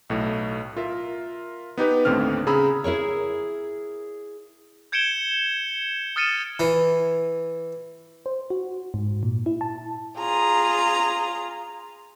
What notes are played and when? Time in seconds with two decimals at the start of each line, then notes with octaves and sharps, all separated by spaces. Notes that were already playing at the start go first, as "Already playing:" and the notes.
0.10 B1 A2
0.77 F4 A#4 E5
1.78 B3 D#4 G4 B4
2.05 G1 D#2 A2 D3 C4 F6
2.47 C#3 G#4 A#5 B5 E6
2.84 E4 G#4 A#4 C#5
4.92 G6 G#6 C#7 D7 E7 G7
6.16 D#6 F6 A6 C#7 D#7 E7
6.60 E3
8.26 C5
8.50 F#4
8.94 G#2
9.23 A#2
9.46 E4
9.61 A5
10.18 F4 G#4 A#5